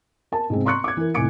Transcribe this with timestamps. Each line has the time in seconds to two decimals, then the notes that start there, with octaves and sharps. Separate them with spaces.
0.32 A#4 A5
0.50 G#2 C3 G#3 C4
0.65 A#5 C6 C#6 F#6 C#7
0.84 D6 G#6
0.97 E3 A#4
1.14 F1 A2 G#5 D6 C#7 D7